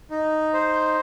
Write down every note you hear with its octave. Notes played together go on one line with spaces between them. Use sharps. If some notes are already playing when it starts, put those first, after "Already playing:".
D#4
C5